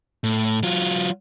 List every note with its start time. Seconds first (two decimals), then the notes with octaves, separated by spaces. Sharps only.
0.24 A2
0.63 F#3 F4